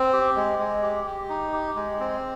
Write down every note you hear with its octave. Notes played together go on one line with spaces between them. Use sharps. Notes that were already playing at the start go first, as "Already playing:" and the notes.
Already playing: C4
G4
G#3
G#3
G4
G4
D#4
G4
G#3
C4